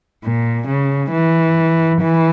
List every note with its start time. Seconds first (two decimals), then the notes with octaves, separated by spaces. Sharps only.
0.24 A#2
0.68 C#3
1.12 E3
2.01 E3